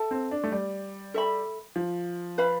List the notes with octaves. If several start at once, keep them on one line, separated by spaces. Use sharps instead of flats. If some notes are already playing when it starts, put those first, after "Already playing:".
Already playing: A4 E5 A5
C4
D4
A3
G3
A4 E5 B5
F3
B4 F5 B5